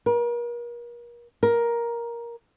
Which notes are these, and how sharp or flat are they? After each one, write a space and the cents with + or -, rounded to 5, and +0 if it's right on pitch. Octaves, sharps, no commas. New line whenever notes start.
A#4 +40
A#4 +10